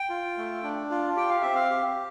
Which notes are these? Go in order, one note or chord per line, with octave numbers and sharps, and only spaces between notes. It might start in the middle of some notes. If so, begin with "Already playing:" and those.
Already playing: G5
F4
A3
D4
F4
G4 G5
F5
C4 E5
F5
G4